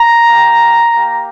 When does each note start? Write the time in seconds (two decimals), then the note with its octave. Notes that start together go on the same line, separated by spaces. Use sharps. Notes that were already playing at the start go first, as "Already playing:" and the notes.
Already playing: A#5
0.28 A#3 G4
0.95 A#3 G4